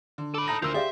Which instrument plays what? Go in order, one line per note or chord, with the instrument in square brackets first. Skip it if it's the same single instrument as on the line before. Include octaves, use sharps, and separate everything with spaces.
[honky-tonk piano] D3
[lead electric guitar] A4 B5 [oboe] D6
[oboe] D#4 [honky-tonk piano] A5 A#5 A#6
[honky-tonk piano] D2 [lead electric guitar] F4 A#4 [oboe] C5 [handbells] E6 G6
[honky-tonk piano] G4 [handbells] G#4 D5 F5 [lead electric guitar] E5